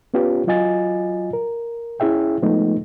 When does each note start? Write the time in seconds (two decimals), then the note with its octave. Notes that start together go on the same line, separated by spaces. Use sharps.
0.14 B3 C#4 F4 G4 B4
0.47 F#3 F4 D#5 G#5 A6
1.33 A#4
2.00 C#4 E4 G#4 E5 G5
2.42 F3 G#3 A3 B3 D#4